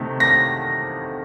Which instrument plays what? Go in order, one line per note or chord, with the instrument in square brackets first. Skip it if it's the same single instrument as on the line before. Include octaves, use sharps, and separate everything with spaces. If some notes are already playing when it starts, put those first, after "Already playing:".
Already playing: [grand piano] C3 D#3 A3
A#6